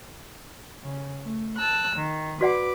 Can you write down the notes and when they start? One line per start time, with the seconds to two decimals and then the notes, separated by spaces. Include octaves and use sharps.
0.85 C#3
1.23 A3
1.57 A5 E6 F#6
1.97 D#3
2.41 F#4 B4 D5 F#5 D6